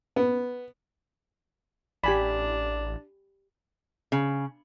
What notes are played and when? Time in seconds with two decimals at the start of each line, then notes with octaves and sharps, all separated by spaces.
0.16 B3
2.04 A1 D4 G4 G#5 B5
4.12 C#3